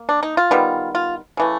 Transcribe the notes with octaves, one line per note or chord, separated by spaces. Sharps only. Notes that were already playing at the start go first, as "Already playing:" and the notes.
Already playing: A#3
D4
D#4
F4
D#3 G3 B3
F4
C#3 E3 A3